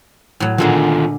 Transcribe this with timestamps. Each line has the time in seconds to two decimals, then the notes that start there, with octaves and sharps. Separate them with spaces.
0.40 A2 F#3
0.58 A#2 D3 D#3 G#3 F4 A4